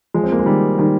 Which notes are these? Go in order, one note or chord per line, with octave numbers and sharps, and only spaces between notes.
F3 G#3
C4
A#3
G#3
D#3 G3
D#3 G3